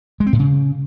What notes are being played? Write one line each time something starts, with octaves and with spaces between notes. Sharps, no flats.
G#3
C4
A2
C#3